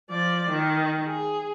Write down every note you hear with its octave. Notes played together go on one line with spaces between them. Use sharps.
F3 D5
D#3
G#4